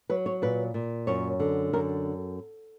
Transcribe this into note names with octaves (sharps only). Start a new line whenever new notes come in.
F#3 B4
C#5
A#2 B4
A#2
F#2 C#5
D3
F#2 A#4